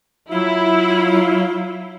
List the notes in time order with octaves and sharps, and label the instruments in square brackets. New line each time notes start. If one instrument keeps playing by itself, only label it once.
[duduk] F#3 [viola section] E4 [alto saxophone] F4